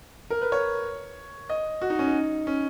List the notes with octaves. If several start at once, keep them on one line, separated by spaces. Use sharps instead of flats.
A#4
B4
C#5
D#5
F#4
D#4
C#4
D#4
C#4